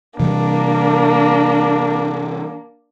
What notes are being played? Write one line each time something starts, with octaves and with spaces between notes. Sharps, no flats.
C3 E3 G3 A#3 D4